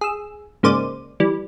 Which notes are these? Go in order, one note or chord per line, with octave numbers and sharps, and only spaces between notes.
G#4 E6
G#2 C#3 A#3 C5 D5 D#7
E3 G3